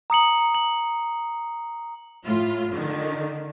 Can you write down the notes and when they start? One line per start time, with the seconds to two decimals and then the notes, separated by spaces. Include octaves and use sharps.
0.10 A#5 D#6 C#7 F#7
0.55 F#7
2.25 A2 F4
2.73 D3 D#3